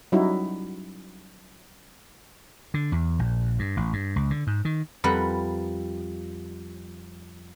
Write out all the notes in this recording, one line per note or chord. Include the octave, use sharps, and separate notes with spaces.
F#3 G3 C#4 D#4 E4 F#4
D3
E2
A#1
G2
A1
G2
C#2
D3
G#2
D#3
F2 G3 A#4 B4 F#5 B5